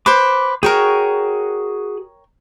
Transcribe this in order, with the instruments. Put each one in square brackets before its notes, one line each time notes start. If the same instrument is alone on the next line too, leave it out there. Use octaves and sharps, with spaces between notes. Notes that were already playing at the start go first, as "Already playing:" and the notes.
[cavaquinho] B4 C5 [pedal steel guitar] D6
[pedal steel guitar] F#4 G#4 [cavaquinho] A#4 C#5 G5